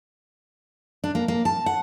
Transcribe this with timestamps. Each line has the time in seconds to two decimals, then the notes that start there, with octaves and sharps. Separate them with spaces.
1.04 D4
1.15 A#3
1.28 A#3
1.45 A5
1.66 F#5